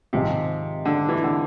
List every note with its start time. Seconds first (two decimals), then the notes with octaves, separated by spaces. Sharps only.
0.13 G#1 G#2 C3 F3 G#3 C4
0.85 D3
1.09 E3
1.24 D3